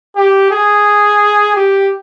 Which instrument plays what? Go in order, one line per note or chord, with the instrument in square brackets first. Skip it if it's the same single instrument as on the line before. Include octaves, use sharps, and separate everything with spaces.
[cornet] G4
G#4
G4